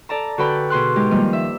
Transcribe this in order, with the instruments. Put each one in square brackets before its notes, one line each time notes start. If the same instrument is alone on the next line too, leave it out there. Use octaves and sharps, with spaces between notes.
[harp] A4 D5 A5 A#5
D3 F#4 A4 B4 G5 B5
B2 G#4 C6 F#6
G#3 D#4 G4
D#3 F3 G3 A#3
E5